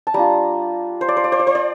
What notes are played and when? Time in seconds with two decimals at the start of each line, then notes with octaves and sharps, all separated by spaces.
0.07 A5
0.14 G3 D4 F4 A#5
1.01 C5
1.09 D5
1.17 C5
1.24 D5
1.32 C5
1.39 D5
1.47 C5
1.55 D5